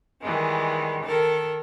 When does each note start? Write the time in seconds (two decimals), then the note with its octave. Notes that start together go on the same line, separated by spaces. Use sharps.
0.22 D#3 E3 G3 G#3
1.05 D#3 A4 A#4